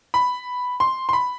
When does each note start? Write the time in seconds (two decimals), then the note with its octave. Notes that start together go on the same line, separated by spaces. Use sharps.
0.14 B5
0.80 C6
1.09 C6
1.13 B5